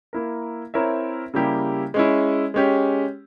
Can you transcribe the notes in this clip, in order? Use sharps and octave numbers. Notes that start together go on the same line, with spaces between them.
A#3 E4 A#4
C4 E4 A#4 C#5 E5
C#3 G3 A#3 E4 G4
G#3 C#4 E4
G#3 C#4 G4